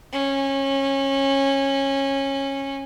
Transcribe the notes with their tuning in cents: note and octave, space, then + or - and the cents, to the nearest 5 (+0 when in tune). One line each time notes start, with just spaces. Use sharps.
C#4 -20